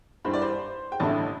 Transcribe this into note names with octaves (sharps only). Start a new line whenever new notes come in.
G2 E3 G3 C5
D5
C5
G5
A1 G2 D3 A3 E4 A5